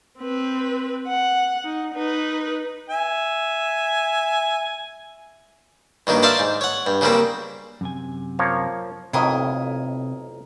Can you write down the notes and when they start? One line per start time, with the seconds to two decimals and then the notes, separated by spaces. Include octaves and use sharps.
0.20 C4 B4
1.08 F#5
1.64 D#4
1.94 D#4 B4
2.90 E5 G#5
6.07 G2 D#3 F#3 A#3
6.23 C5 D5 E5 F5 A5 C6
6.39 G#2
6.61 C#5 F#5
6.86 G2
7.01 C#3 F#3 G3 A#3 C4
7.81 F#2 C3 G#5
8.39 F3 A#3 C#5
9.13 B1 F2 A2 C3 E4 A#4 D#5